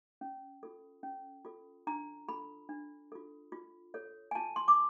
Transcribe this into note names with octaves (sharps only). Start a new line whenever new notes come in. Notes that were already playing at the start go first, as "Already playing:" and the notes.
C#4
F4 A4
C#4
F4 A4
D4 A#5
F4 A4 B5
D4
F4 A4
F4
A4 C#5
G#5
F4 A5
C6
D6